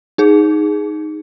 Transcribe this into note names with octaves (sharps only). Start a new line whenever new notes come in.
D#4 G#4